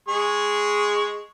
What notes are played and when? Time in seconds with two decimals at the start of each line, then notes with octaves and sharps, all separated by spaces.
0.08 G#3 G#4 C#6